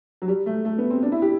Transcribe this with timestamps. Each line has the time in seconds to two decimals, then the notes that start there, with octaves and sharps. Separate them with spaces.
0.22 F#3
0.28 G3
0.46 A3
0.65 A3
0.78 B3
0.90 C4
1.02 D4
1.12 E4
1.22 G4